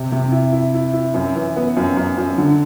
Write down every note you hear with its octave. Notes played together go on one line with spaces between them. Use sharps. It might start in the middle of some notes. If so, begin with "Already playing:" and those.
Already playing: C3
C3
E4
E4
E4
E4
F#2
E3
B3
F#2
F#2
F#2
D3